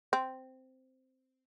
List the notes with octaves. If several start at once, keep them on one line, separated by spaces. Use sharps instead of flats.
C4